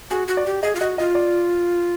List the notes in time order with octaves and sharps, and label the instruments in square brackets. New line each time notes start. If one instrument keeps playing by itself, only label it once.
[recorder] F#4 [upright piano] G#4
[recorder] F#4
[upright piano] D5
[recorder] G4
[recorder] G#4 [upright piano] D#5
[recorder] F4
[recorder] F#4 [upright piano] D#5
[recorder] F4 [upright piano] D#5
[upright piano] D5